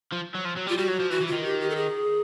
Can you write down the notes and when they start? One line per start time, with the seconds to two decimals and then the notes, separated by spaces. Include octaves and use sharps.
0.12 F3
0.34 F#3
0.45 F3
0.56 F#3
0.66 G3
0.69 F4
0.78 G3 F#4
0.88 F#3
1.00 F3
1.10 E3 F#4
1.21 E3
1.27 F4
1.32 D#3
1.44 G4
1.60 G4
1.70 A4
1.76 G#4